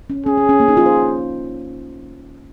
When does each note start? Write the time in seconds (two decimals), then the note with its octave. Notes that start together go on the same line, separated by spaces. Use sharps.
0.10 C#4
0.26 C#4 G#4
0.38 C#4
0.49 C#4
0.60 A#3
0.68 D#4
0.77 F4
0.86 C5